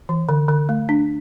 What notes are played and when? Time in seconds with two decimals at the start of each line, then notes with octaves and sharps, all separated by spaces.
0.09 E3
0.29 D3
0.49 D3
0.69 A3
0.89 D4